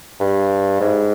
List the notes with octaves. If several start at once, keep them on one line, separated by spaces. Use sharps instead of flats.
G2
G#2